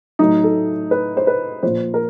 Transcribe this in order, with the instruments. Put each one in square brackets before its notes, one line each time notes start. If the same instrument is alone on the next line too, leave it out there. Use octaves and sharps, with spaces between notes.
[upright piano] A2 F#3 D#4
A4
B4
C5
B4
A#2 F3 C5
A#4